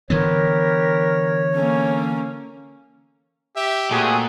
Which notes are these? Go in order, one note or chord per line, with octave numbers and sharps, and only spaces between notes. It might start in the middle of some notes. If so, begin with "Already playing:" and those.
D3 E3 B3 G4 A#4 B4 C#5
A#3 C#4 A4
G4 E5
A#2 A3 C4 F#4 G#4